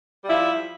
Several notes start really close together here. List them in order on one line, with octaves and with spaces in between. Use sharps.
G3 F3 E4